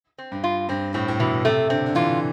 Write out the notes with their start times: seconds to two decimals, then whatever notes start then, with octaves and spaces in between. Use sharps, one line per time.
0.18 C4
0.32 G2
0.44 F4
0.69 G2 C4
0.94 A2 C4
1.08 A2
1.19 B2 E3
1.45 C3 A3
1.70 D3 C4
1.86 D3
1.95 E3 F4